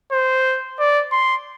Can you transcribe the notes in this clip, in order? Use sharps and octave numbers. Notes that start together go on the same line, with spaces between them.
C5
D5
C6